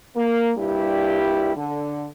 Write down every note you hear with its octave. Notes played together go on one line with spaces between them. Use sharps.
A#3
G2 A#2 G3 E4 G4
D3